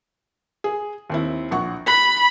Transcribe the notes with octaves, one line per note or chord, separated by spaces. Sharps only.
G#4
D#2 C4 E4
A#1 F#5 C#6
B5 F#6